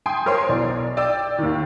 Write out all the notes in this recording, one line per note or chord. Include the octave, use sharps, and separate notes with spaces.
G5 G#5 C6 D#6
A#4 C5 C#5 C6
B1 E3 D5
D5 G5 E6
D#2 D#3